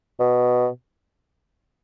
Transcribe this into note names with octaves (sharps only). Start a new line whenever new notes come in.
B2